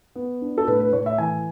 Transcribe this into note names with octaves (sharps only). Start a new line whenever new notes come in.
B3
D4
A4
A2 B4
B4
A2 C#5
E5
E3 G#5